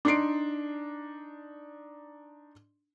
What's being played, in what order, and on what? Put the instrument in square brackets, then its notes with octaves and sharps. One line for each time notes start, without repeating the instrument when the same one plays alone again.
[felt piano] D4 D#4 C6 C7 D7